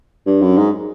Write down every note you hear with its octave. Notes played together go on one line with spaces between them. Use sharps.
G2
F#2
G#2